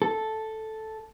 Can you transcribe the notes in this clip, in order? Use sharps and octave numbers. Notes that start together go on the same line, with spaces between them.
A4